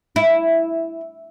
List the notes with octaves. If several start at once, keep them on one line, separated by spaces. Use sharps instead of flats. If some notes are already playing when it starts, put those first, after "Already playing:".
E4